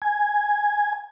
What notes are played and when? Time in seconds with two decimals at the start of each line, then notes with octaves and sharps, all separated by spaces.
0.02 G#5